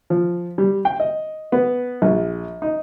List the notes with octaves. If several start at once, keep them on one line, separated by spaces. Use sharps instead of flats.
F3
G3
G5
D#5
B3
A#1
D#4